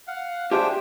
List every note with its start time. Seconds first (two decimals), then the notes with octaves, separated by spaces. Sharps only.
0.07 F5 F#5
0.51 D4 G4 G#4 C5 E5 G5